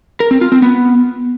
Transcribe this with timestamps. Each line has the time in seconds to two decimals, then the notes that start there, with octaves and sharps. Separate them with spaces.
0.20 A#4
0.31 C4
0.41 F4
0.52 C4
0.62 B3